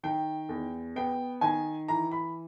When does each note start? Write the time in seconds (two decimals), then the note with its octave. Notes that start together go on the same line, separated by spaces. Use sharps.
0.04 D#3 G5
0.49 E2
0.96 B3 G5
1.41 D#3 G#5
1.88 E3 A#5
2.11 B5